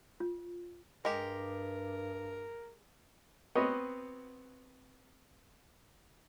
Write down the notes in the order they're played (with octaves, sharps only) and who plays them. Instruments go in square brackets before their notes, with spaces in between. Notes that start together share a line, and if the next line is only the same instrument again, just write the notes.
[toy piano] F4
[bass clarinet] G2 [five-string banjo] G#3 G4 [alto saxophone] A#4
[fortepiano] B3 C4 F#4 B4 C#5 D#5